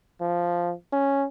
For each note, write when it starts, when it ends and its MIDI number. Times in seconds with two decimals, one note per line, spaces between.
0.20 0.73 53
0.92 1.25 61